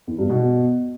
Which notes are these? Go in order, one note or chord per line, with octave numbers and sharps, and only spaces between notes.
E2
G2
B2